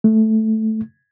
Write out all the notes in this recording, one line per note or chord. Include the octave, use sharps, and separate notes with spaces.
A3